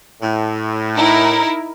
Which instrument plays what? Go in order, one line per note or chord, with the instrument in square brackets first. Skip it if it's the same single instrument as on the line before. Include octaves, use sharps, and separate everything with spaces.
[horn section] A2
[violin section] D#4 E4 A#4